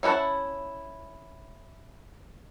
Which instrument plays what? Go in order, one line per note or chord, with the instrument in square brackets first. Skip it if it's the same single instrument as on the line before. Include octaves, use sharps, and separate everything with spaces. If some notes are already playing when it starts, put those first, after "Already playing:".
[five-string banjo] C#4 E4 C#5 F#5 A5